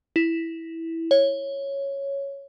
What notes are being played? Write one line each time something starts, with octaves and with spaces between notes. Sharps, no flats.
E4
C#5